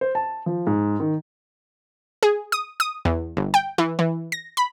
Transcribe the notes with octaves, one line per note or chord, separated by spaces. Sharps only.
C5
A5
F3
G#2
D#3
G#4
D#6
D#6
E2
G1
G5
E3
E3
A#6
B5